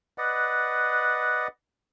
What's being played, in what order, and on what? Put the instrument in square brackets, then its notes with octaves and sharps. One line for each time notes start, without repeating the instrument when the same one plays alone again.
[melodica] B4 D5 D#5 F#5